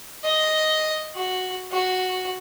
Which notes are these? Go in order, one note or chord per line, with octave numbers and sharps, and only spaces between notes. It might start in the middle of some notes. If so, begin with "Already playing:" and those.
D#5
F#4
F#4